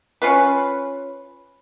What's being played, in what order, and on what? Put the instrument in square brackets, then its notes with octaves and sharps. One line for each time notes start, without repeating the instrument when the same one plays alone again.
[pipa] C#4 F4 B4